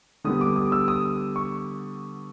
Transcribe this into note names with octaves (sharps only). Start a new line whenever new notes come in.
D3 G3 B3 D#6
D6
D#6
E6
D#6
C#6